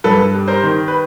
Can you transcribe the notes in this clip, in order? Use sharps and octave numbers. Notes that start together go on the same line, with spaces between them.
G2 A4 B4
G3
A#4 C5
D#3
B4